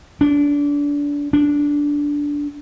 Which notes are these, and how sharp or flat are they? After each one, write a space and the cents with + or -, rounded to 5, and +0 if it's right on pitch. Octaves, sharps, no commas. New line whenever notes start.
D4 -25
D4 -10